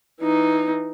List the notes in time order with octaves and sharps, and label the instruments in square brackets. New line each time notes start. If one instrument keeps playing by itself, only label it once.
[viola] E3 D#4